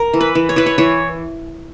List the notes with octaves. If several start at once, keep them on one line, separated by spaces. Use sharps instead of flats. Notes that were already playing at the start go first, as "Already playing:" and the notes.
Already playing: A#4
E3
B4
E3
C#5
E3 B4
C#5
E3 C#5